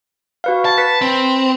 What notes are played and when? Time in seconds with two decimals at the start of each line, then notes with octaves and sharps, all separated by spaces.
0.44 F#4 B4 F5
0.65 A5
0.78 B4 B6
1.01 C4